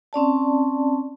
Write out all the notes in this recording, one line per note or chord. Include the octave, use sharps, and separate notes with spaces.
C4 C#4 D5 A5